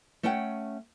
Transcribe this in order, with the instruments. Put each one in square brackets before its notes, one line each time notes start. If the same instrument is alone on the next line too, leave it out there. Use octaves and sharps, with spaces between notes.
[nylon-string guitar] A3 C#4 C#5 F#5 G5